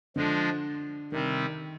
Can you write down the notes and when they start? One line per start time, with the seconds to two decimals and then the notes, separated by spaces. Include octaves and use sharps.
0.16 D3 F3 G#3 D4 F4
1.12 C3 D#3 G3 C4